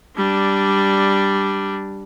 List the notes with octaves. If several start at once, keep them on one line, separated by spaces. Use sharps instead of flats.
G3 D4